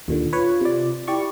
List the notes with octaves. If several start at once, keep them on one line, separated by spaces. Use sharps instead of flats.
D#2 A#2 D3
F4 B4 C#5
C3 D5
E4 G4 D5 C#6